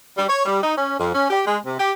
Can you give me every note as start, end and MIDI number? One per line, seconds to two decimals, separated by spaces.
0.18 0.25 55
0.29 0.42 73
0.46 0.63 55
0.63 0.74 63
0.78 0.96 61
1.00 1.12 41
1.15 1.30 61
1.30 1.43 67
1.47 1.58 56
1.66 1.79 48
1.79 1.92 67